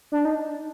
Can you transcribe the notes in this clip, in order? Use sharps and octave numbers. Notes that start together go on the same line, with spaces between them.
D4
D#4